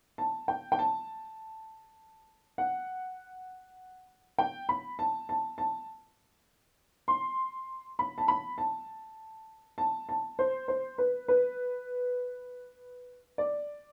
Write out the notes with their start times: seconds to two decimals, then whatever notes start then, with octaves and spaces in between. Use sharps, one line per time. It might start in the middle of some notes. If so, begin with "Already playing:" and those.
0.18 A5
0.48 G5
0.72 G5
0.79 A5
2.58 F#5
4.38 G5
4.69 B5
4.99 A5
5.29 A5
5.58 A5
7.08 C6
7.99 B5
8.18 A5
8.28 B5
8.58 A5
9.78 A5
10.09 A5
10.39 C5
10.68 C5
10.98 B4
11.28 B4
13.38 D5